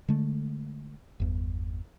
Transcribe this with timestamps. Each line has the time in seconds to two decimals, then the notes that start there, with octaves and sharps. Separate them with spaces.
0.09 D3 G#3 A3
1.20 G1 E2